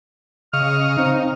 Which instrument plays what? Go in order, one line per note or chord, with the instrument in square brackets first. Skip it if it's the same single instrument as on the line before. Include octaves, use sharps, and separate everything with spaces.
[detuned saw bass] C#3 [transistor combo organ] D#5 F5 C#6 [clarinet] F6
[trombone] C4 [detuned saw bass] D#4